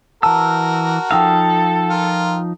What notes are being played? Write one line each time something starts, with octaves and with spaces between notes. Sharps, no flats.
E3 F#4 A#4 A5 E6
F3 D#4 A4 F5 G5 E6
F4 A#4